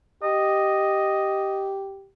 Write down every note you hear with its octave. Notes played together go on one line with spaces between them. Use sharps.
G4 D#5